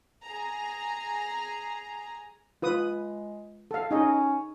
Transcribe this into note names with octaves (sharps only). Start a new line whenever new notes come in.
G#4 A#5
G#3 F4 B4 D#6
A4 F5
C#4 D#4 G#4 D#5